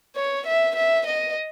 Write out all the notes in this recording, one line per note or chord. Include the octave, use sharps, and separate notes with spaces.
C#5
E5
E5
D#5